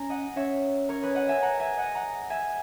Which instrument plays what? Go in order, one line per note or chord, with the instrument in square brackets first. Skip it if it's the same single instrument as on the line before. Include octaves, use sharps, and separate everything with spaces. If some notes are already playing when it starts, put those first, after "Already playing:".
Already playing: [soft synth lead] C#4 [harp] G#5 A#5
[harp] D#5 F#5
[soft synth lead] C#4 [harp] C#5 E5
[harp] A#4 C#5
G#4 B4
D#5 F#5
E5 G#5
F#5 A#5
E5 G#5
D#5 F#5
F#5 A#5
E5 G#5